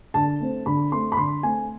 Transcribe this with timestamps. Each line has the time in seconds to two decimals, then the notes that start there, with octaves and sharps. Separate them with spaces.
0.14 D3 A5
0.40 A3 C4
0.66 D3 B5
0.92 A3 C4 C6
1.12 B5
1.17 D3 C6
1.43 A3 C4 G#5